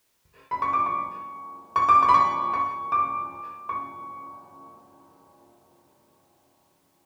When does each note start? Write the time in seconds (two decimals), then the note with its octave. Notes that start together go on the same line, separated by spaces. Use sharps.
0.51 B5
0.62 C#6
0.73 D6
0.86 C#6
1.76 C#6
1.89 D6
2.03 C#6
2.09 B5
2.14 C#6
2.53 C#6
2.92 D6
3.69 C#6